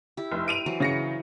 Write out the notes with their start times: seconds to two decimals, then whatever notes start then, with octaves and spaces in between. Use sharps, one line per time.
0.17 E4 G4
0.32 F1
0.48 D7 D#7 F7
0.66 E3 F#3 C5
0.80 C#3 A#6 C#7